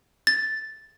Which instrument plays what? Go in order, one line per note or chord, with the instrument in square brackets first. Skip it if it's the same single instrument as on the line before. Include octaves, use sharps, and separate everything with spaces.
[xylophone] A6